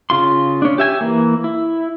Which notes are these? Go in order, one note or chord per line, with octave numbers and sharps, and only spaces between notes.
C#3 F4 C6
C#4 D4
G4 E5 G#5
E3 A#3
E4